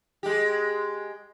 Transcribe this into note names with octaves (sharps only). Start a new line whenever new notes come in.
G#3 G4